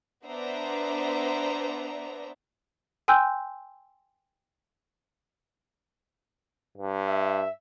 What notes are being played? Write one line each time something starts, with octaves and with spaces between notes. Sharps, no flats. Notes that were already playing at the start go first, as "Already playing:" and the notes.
B3 D4 C5 D5 E5 A#5
G5 G#5 C6 E6 F#6 G6
G2
E5